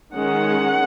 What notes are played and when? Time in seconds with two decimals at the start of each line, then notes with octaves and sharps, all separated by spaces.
0.14 D#3 G#3 C#4 F#5